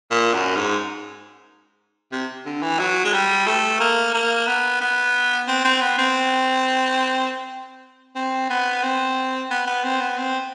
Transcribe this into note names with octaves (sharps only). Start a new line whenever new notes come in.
A#2
F#2
G#2
C3
D3
E3
F#3
G#3
G3
A3
A#3
A#3
B3
B3
C4
C4
B3
C4
C4
B3
C4
B3
B3
C4
B3
C4